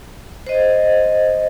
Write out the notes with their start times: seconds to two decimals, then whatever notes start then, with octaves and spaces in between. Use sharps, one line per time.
0.47 C5 D#5